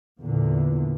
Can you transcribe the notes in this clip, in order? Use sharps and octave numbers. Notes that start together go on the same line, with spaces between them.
E2 A#2 D3